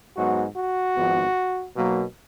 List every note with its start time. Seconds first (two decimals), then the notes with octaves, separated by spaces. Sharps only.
0.16 G#2 F#3 B3 F#4
0.57 F#4
0.97 G#1 G#2 F3 B3
1.76 B1 B2 F#3 A#3